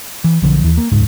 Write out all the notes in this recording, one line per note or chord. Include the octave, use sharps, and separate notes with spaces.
E3
B1 D3 F3
D#2 E3
A#3
D#1 C#2 G#2